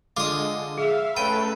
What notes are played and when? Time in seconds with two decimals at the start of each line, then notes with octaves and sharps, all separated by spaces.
0.17 D3 G#3 F4 D6 D#6
0.78 G#4 E5 F5
1.17 A3 C#4 A4 B4 G5 D#7